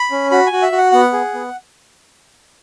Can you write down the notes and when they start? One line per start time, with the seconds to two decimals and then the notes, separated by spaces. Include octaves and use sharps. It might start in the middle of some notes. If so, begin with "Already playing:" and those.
Already playing: B5
0.11 C#4
0.31 F#4 B5
0.47 G#5
0.52 F#4
0.62 E5
0.72 F#4
0.78 F#5
0.92 B3 F#5
1.13 G#4
1.34 B3